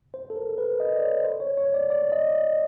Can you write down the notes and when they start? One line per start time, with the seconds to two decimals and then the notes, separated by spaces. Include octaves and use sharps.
0.14 C5
0.30 A4
0.36 A#4
0.58 B4
0.80 D#5
0.96 D5
1.02 C#5
1.24 C5
1.40 C#5
1.57 C#5
1.74 D5
1.90 D5
2.12 D#5